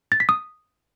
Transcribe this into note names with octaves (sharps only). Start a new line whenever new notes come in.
A6
B6
D#6